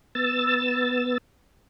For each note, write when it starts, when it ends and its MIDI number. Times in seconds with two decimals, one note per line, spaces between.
0.15 1.18 59
0.15 1.18 88
0.15 1.18 93